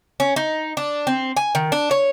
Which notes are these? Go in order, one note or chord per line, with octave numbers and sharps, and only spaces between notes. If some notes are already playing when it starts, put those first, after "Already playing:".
C#4
D#4
D4
C4
G#5
D#3
D4
C#5